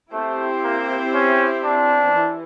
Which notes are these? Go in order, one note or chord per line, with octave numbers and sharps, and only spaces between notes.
A3 C4 E4 G4 C5
A#3
C#4
D4
E3